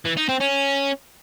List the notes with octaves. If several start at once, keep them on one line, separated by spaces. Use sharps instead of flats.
E3
D#4
C4
C#4